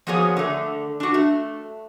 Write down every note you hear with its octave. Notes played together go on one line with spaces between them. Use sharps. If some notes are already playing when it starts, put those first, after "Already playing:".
F3 A#3 B3 F#4 G#4 C#5
D3 A3
D4 F#4
A3